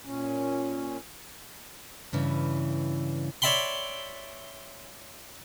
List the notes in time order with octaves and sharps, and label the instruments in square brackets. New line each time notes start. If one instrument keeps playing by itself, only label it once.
[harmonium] A#2 C#4
[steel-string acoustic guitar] G2 C#3 E3
[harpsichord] C#5 D5 E5 G5 B5 C6